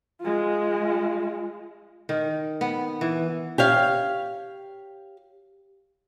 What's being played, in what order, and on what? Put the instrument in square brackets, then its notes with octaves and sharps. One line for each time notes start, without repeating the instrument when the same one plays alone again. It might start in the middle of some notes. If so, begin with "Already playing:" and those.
[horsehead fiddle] G#3 F4
[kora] D#3
B3
E3
[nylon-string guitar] G4 C#5 F5